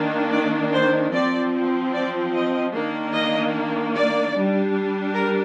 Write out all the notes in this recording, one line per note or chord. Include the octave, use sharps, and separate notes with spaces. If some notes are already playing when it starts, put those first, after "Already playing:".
Already playing: D#3 A#3 D4
D5
C5
F3 C4 D5
D5
D#5
D#3 A#3 D4
D#5
D5
G3 D4
A#4